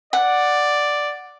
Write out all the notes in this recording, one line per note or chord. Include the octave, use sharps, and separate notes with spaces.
D5 F#5